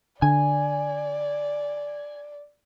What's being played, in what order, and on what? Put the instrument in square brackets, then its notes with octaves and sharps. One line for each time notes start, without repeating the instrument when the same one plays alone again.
[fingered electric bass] D3 [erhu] D5 [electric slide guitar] G#5